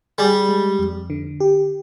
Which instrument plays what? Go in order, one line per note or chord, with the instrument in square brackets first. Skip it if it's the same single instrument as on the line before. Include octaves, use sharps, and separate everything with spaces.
[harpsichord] G3 [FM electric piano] G#4
[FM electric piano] G#3
F2
D3
G4